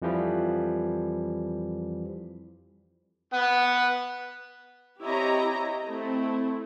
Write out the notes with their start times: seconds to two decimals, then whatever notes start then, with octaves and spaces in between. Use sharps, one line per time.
0.02 F2 E3 F3 G3
3.34 B3 F#5
5.03 C4 E4 G4 C#5 D#5 A#5
5.85 A3 C4 E4